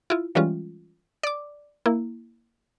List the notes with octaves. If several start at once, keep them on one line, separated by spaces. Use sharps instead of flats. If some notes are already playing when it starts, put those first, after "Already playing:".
E4 F4
E3 G3 G#3 C#4 F4
D5 D6
A#3 E4